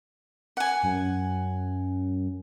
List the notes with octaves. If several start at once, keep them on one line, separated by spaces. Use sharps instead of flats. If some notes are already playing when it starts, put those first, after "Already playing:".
F#5 G#5
F#2